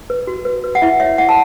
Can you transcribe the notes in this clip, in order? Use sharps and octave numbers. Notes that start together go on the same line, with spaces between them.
B4
F#4
B4
B4
F#5
E4 E5
C#5 E5
E4 F#5
A5